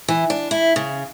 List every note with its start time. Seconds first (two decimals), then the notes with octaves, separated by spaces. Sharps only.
0.08 E3
0.30 D4
0.51 E4
0.76 C#3